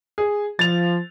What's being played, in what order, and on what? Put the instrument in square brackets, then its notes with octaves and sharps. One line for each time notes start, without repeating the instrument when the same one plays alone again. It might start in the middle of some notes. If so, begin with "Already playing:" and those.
[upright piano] G#4
[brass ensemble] F3 [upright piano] A6 F7